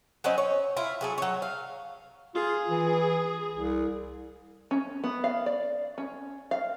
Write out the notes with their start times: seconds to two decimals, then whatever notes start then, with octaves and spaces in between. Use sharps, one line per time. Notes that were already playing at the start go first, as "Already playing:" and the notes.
0.24 F#3 C4 C#4 D#5
0.38 C#5
0.77 E4 F4
1.01 F#3 G#4 A4
1.18 F#3 C#5
1.42 F5
2.35 F4 G#4
2.70 E3
3.54 C2
4.71 C#4
5.04 B3
5.24 F5
5.46 D5
5.98 C#4
6.51 F5